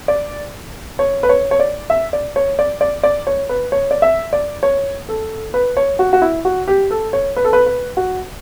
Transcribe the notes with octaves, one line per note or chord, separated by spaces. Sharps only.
D5
C#5
B4
C#5
C#5
D5
E5
D5
C#5
D5
D5
D5
C#5
B4
C#5
D5
E5
D5
C#5
A4
B4
C#5
F#4
F#4
E4
F#4
G4
A4
C#5
B4
A4
B4
B4
F#4